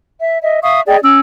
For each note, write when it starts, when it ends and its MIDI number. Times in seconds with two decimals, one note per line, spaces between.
0.20 0.38 76
0.42 0.60 75
0.42 0.60 76
0.62 0.80 76
0.62 0.80 77
0.62 0.80 85
0.62 0.80 87
0.87 0.97 68
0.87 0.97 74
0.87 0.97 75
0.87 0.97 79
1.03 1.20 61
1.03 1.20 88